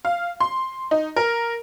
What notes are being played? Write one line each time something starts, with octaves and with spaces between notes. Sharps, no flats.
F5
C6
D#4
A#4